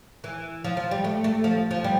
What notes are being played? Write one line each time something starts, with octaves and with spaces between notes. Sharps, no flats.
E3
F3
F3
G3
A3
A3
F3
F3
G3